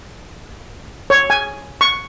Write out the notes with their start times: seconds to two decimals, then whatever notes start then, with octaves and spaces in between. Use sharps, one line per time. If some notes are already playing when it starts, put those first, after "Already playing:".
1.10 C#5
1.30 G#5
1.81 C#6